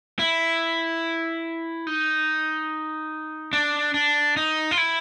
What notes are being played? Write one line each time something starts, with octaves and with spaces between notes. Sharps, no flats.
E4
D#4
D4
D4
D#4
F4
E4